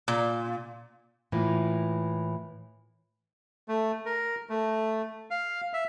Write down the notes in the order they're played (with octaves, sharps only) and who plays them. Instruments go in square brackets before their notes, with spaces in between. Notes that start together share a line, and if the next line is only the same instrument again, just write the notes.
[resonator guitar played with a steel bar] A#2
[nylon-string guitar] A2 E3 A#3 E4 F4
[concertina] A3
A#4
A3
F5
E5